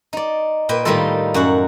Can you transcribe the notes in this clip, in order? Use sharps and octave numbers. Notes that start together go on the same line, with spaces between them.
D#4 D5
A#2 B4 G5
A2 D#3 G3 D#4 F4 A4
F#2 F#4 F#5